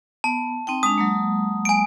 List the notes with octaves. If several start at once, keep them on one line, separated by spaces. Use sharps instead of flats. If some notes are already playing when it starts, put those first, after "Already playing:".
B3 A5
C4 D#4 G5
G#3 D4 D#6
F#3 G#3 A#3
G#5 D7